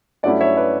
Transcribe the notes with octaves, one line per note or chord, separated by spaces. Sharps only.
G2 F#3 A3 C#4 E4 D5 F#5
C#5 E5
B4 D5